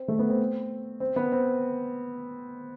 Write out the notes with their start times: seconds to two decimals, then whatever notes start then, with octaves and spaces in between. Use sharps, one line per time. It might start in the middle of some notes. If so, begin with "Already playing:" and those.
Already playing: C4
0.08 A3
0.19 B3
0.29 C4
1.00 C4
1.16 B3
1.32 C4